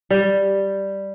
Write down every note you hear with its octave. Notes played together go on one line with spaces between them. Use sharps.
G3